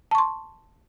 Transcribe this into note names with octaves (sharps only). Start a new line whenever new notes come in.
A5 C6 C#6